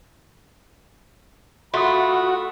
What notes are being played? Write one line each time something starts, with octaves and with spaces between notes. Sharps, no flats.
A3 F4 F#4 B5 C6 D#6